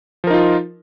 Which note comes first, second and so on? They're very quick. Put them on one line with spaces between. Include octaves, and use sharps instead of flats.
F3 A#4 D#4 F4